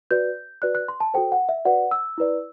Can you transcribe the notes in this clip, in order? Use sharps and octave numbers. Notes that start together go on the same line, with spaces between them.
F#4 B4 D5 G6
F#4 B4 D5 F#6
F#6
C6
A5
F#4 A4 C5 G5
F#5
E5
F#4 B4 D5 F#5
E6
E4 B4 D5